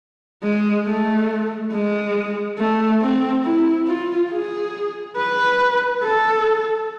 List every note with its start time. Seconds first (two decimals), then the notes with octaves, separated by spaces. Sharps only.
0.43 G#3
0.86 A3
1.72 G#3
2.58 A3
3.01 C4
3.45 E4
3.87 F4
4.31 G#4
5.17 B4
6.02 A4